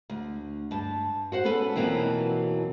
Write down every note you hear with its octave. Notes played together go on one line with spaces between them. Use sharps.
D2
G2 A5
F#4 C5 F#5
B3 C#4 A4 B4
F2 B2 E3 F#3 A#3 C4